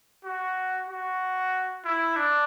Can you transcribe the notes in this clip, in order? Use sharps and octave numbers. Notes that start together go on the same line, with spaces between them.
F#4
F#4
E4
D4